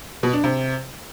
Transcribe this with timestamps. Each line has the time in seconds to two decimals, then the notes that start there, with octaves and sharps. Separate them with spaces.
0.23 B2
0.33 D4
0.44 C3